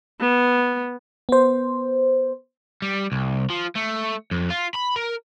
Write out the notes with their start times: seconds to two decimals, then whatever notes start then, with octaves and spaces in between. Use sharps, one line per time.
0.20 B3
1.29 B3 C5
2.82 G3
3.12 C2
3.50 F3
3.75 A3
4.31 F2
4.50 F4
4.74 B5
4.96 A#4